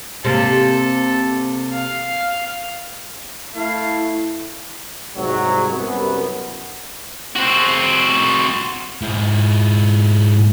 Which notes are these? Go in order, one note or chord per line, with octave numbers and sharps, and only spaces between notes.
C3 A#3 A4
F5
A3 E4 F5
C2 G#2 F#3
C2 F#2 B3
C4 F#4
G#2 E4